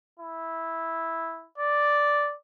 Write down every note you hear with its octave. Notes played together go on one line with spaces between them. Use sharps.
E4
D5